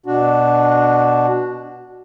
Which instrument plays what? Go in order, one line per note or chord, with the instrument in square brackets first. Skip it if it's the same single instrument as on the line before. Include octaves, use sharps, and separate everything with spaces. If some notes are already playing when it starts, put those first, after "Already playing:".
[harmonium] B2 D4 F#4